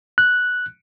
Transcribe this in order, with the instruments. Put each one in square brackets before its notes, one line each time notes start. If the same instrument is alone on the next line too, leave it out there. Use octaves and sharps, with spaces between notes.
[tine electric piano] F#6